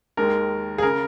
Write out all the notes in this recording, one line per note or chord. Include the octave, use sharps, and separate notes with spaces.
D#2 D#3 G#3 A#4
G#4
C#3 A#4